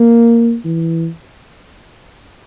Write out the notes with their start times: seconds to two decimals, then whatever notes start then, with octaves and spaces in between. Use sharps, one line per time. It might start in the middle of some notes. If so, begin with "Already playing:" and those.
Already playing: A#3
0.65 E3